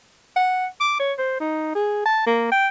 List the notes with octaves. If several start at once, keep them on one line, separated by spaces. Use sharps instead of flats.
F#5
D6
C#5
C5
D#4
G#4
A5
A#3
G5